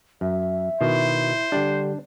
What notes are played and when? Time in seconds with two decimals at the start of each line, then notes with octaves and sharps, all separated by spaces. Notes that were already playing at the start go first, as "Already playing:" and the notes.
0.21 F#2 E5
0.81 B2 D#3 E4 C5
1.52 D3 G3 D4 G4